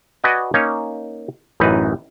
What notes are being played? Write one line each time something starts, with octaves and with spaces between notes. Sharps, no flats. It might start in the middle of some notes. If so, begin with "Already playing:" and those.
F#4 B4 D5 D#5 F#5 G#5
A#3 C#4 D#4 C#5
A1 F#2 E3 D#4 B4